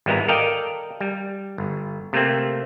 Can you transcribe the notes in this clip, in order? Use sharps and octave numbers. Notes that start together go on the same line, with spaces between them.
G#1 G3 G#3 B3 E4 A#5
A4 A#4 D5 D#5 F5 G5
G3
G1
C3 A3 A#3 C4